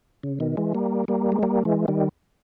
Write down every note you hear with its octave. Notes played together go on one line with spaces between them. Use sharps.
C#3
B2 D#3
E3 G#3
G3 A#3
G3 A#3
G#3
G3 A#3
E3 G#3
D#3 G3